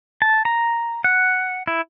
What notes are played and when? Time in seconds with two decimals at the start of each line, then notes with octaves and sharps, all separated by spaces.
0.22 A5
0.45 A#5
1.04 F#5
1.67 E4